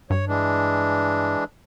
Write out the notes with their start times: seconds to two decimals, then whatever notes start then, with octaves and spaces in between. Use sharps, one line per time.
0.10 G2 C#5
0.28 E3 G#3 D4